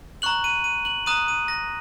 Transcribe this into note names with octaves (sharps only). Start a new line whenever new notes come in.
A#5 C#6 F#6 F#7
D#7
D#7
F#7
A#5 D#6 F#6 D#7
D#7
A#6